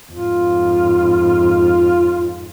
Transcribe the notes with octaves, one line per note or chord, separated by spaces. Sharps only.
F2 G#2 F4